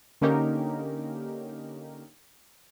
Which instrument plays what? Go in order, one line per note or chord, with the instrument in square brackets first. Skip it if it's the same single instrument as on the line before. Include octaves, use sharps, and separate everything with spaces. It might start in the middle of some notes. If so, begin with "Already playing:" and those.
[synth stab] D3 A#3 C#4 D#4 G4 A#4